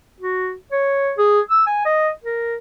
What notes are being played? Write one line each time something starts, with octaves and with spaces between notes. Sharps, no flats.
F#4
C#5
G#4
E6
G#5
D#5
A#4